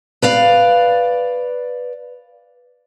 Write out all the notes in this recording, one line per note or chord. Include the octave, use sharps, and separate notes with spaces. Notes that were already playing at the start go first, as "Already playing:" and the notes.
B4 D5 F5